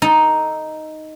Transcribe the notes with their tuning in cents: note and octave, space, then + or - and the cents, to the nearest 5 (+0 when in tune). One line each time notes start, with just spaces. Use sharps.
D#4 +0 A4 +0